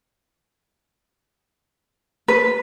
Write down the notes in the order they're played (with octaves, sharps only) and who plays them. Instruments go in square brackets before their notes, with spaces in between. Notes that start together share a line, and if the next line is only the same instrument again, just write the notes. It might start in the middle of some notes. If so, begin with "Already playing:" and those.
[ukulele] B4